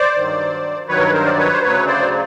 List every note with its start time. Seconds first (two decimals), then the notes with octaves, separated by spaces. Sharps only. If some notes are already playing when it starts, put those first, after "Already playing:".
Already playing: C5 D5
0.15 G2 D#3 F#3
0.88 G2 D#3 F#3 B4 C#5
0.99 A#4
1.06 B4
1.13 A#4 C5
1.26 D5
1.38 B4 C#5
1.53 C5
1.62 D2 C#3 F#3 B4 C#5
1.87 C5 D5